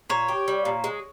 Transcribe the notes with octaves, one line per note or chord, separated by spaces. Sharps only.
A#2 C#5
G4
G3
A#2
G#3